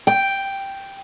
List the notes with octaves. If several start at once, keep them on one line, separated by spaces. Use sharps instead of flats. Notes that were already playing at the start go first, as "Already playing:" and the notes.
G5